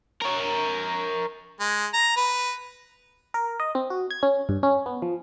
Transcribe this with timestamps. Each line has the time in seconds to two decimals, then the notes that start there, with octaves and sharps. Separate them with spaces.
0.22 A#4 C#5
1.60 G#3
1.93 A#5
2.17 B4
3.34 A#4
3.60 D#5
3.75 C4
3.90 F#4
4.11 G#6
4.23 C#4
4.49 G2
4.63 C#4
4.86 B3
5.02 F3